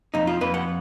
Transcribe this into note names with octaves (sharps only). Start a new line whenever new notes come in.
F2 D#4
F4
F2 B4
F#5